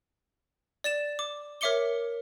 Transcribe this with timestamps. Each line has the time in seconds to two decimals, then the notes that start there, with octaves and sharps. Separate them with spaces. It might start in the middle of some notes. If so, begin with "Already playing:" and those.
0.84 D5 A6 E7
1.19 D6
1.61 A#4 C#5 E5 D6 C#7 G7